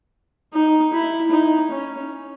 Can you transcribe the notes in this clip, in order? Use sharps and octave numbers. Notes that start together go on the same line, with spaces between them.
D#4
E4
D#4
C#4